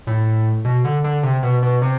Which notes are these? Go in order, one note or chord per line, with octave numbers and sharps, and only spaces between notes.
A2
B2
D3
D3
C3
B2
B2
C3